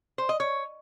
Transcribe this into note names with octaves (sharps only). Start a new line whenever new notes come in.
C5
D#5
C#5